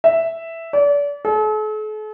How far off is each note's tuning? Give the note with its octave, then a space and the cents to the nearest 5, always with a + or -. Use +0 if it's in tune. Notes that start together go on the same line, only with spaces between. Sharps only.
E5 +0
D5 -35
A4 -45